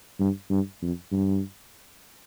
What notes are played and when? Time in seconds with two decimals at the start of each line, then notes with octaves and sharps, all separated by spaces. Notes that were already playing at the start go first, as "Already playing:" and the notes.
0.20 G2
0.50 G2
0.82 F2
1.12 G2